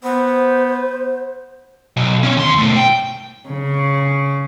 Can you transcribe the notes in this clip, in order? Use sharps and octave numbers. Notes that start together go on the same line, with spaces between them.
B3 C5
B1
C4 C#4
D#2 C6
B2 A3
G5
C#3